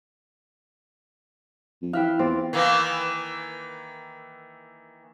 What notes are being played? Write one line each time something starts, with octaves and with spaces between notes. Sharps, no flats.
F2
E3 E4 E5 F5 G5 F#6
E2 C4 F4 D6 A6
D#3 E3 A#3